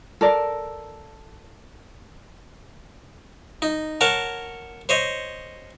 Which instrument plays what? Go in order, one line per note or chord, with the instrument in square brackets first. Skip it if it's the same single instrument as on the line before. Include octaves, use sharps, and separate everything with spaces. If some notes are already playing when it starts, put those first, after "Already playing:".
[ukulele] A4 A#4 D5
[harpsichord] D#4
A#4 C#5 F#5 A5
C5 C#5 D#5